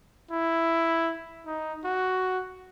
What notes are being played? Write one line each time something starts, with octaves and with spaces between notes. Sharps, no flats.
E4
D#4
F#4